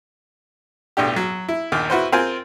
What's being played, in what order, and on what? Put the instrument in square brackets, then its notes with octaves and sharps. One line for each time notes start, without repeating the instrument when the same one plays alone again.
[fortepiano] B1 A2 D4 G4
F#3
E4
A#1 D#2 A#2
E4 F#4 B4 C5
C4 F4 A#4 C5 G#5